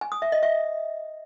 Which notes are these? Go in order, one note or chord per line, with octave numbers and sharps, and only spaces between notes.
G#5
D#6
E5
D#5
E5